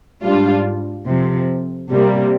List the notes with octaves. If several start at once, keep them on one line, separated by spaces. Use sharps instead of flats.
G#2 G3 D4 F4
F2 C3 F3
C3 G3 A#3